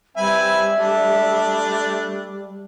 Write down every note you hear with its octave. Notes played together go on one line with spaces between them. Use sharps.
G3 C4 B4 E5 G#5
A3 D4